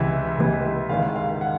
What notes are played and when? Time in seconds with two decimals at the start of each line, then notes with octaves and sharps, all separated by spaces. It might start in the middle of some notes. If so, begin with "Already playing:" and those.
Already playing: C#2 C3 E3 E5
0.38 C#2 C3 E3
0.89 G#2 D#3 G#3 F5
1.16 F5
1.41 F#5